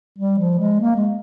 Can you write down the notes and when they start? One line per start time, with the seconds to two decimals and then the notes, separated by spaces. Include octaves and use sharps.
0.18 G3
0.39 F3
0.59 G#3
0.81 A#3
0.96 G#3